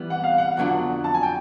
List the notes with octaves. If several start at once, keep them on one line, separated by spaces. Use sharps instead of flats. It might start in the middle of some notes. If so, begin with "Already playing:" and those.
Already playing: E3 G3 B3
F#5
F5
F#5
F2 D3 F#3 B3 D4 F#5
A5
G#5
G5